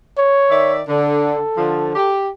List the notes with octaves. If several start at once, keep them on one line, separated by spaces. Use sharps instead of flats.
C#5
D#3 D5 E5
D3 A4
D3 F3
G4